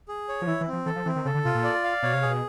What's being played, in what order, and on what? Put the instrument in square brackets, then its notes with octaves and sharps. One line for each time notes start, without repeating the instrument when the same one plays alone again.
[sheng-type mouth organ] G#4
C#5
[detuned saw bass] F3
[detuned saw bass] E3 [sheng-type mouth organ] E4
[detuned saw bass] E3
[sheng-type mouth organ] C4
[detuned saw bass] F3
[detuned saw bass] E3 [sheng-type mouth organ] A4
[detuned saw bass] F3
[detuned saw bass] E3 [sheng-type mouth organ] C4
[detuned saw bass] D#3
[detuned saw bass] C#3 [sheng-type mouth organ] A4
[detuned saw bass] D3
[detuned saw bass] C3 [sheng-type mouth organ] F4
[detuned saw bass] A#2
[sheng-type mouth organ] D5
F5
[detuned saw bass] B2 [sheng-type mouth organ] C#5
[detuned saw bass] C3
[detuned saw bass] B2 [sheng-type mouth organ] G#4